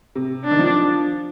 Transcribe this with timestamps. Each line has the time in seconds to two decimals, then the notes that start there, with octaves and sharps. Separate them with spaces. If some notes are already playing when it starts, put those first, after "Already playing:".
0.15 C3
0.45 D4
0.51 D#3
0.59 F3